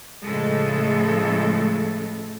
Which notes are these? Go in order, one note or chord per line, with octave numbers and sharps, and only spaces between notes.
A2 C#3 F3 G#3 A3 A4